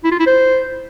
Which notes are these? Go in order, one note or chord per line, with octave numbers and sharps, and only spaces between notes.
E4
F4
E4
C5